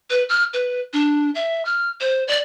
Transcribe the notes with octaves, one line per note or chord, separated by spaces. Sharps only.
B4
F6
B4
D4
E5
F6
C5
D5